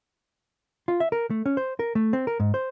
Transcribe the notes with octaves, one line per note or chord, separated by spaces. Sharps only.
F4
E5
A#4
A3
C#4
C5
A#4
A3
C4
A#4
G#2
C5